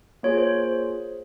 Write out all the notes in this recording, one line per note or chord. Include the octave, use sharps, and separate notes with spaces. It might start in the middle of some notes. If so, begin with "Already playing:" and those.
A#3 F4 G#4 C#5
C5